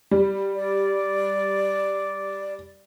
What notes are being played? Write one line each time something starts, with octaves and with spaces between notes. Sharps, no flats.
G3
D5